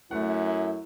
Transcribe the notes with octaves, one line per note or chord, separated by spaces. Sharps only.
F#2 A3 E4 F#5